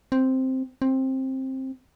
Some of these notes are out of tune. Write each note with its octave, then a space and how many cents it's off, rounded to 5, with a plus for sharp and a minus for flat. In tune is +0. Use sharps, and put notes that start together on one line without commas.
C4 +0
C4 +15